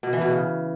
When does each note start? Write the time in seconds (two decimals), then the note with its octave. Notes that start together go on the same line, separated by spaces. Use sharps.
0.03 B2
0.13 E3
0.21 B2
0.31 C#3